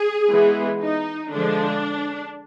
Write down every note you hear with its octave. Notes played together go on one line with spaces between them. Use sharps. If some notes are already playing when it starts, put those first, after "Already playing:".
Already playing: G#4
E3 G#3 B3
D#4
D3 F3 G#3 D4